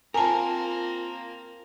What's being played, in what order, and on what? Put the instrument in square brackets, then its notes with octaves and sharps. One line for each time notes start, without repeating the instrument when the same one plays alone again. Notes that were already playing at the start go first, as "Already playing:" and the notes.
[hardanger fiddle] A#3 C4 [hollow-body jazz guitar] F4 A#4 [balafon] G#5 A5